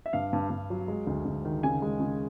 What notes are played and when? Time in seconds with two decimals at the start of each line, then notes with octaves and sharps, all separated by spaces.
0.06 E5
0.13 G2 F5
0.33 G2
0.50 G2
0.70 F#3
0.88 G#3
1.07 D2
1.25 D2
1.45 D#3
1.63 C#3 G#5
1.82 G#3
2.00 C#3